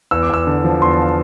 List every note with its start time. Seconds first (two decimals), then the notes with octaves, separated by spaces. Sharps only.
0.11 E2 E6
0.23 D6
0.30 E2 E6
0.47 D3
0.64 F3
0.82 E2 C6
0.91 A5
1.00 F5